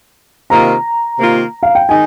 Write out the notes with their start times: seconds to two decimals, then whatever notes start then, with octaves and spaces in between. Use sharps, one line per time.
0.50 C3 D#3 A#3 F4 A#5
1.19 C3 D#3 A#3 F4
1.63 F5
1.75 G5
1.89 D#3 G#3 D#4 G#5